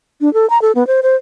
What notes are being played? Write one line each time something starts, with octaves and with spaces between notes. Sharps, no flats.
D4
A4
A#5
A4
B3
C5
C5